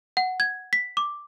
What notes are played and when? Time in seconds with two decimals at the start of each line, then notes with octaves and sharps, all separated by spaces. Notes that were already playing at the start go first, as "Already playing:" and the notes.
0.17 F#5
0.40 G#6
0.73 B6
0.97 D6